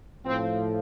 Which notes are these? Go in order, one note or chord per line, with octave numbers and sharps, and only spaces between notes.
A2 F3 C4